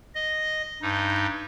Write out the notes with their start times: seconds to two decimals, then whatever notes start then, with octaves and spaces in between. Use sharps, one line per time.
0.15 D#5
0.82 G2 D#4